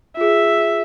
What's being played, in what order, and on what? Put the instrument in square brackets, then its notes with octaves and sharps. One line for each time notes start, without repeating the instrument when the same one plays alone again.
[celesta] F4 G#4 [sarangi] E5